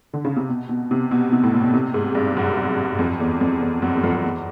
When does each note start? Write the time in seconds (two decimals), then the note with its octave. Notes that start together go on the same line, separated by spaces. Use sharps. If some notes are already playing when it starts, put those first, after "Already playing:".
0.13 D3
0.25 C#3
0.36 C3
0.49 B2
0.69 B2
0.91 C3
1.11 B2
1.33 C3
1.43 A2
1.54 A#2
1.64 B2
1.74 C3
1.94 G#2
2.15 G2
2.37 F#2
2.99 F2
3.20 E2
3.41 F2
3.61 E2
3.82 F#2
3.95 E2
4.03 F2
4.14 F2
4.24 E2